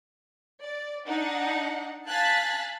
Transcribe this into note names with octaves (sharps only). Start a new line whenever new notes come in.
D5
D4 D#4 F#5
F5 G#5 A5 F#6 A6 B6